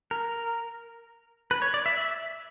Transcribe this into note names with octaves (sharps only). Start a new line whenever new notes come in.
A#4
B4
C#5
D5
E5
E5